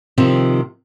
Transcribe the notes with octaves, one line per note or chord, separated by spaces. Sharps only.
C3 D#3 F3 C4